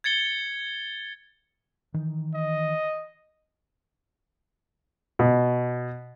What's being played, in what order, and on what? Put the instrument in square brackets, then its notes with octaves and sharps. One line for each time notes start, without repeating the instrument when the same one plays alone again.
[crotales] G#6 A6 C#7 G7
[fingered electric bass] D#3 E3
[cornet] D#5
[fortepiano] B2